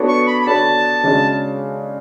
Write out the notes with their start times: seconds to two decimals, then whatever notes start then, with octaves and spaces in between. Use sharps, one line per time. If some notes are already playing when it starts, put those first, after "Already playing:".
Already playing: B3 D4 F#4 A4 C#5
0.08 C#6
0.27 B5
0.42 B5
0.46 B3 D4 F#4 A4 C#5 A5
1.04 C#3 G#3 D4 F#4